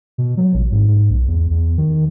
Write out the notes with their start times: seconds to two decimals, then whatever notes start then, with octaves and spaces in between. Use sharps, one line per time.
0.18 B2
0.37 F#3
0.54 A1
0.72 G#2
0.88 G#2
1.10 B1
1.28 E2
1.51 E2
1.78 D#3